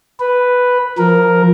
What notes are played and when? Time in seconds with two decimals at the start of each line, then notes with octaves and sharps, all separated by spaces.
0.20 B4
0.98 F3 A#4